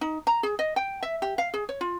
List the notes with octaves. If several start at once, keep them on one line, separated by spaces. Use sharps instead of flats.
D#4
A#5
G#4
D#5
G5
E5
G4
F5
G#4
C#5
F4